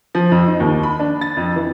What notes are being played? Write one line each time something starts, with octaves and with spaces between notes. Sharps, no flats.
F3
F2
D#4
D#2
B5
D4
A6
F2
E3